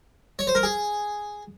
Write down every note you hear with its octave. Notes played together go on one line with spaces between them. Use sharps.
C#5
C5
A#4
G#4